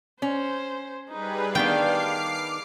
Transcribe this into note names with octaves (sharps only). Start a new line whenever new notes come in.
C#4 C5
G3 D#4 G#4 B4
D#3 B3 D4 F5 G5 D6 F6 C7